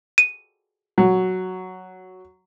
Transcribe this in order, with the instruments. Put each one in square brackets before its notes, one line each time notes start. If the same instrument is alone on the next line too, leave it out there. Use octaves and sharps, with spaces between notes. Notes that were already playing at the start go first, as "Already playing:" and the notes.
[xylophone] D#7
[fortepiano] F#3